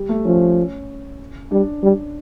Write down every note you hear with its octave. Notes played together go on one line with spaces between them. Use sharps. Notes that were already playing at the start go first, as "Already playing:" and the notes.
Already playing: G3
A3
F3 C#4
G3 D4
G3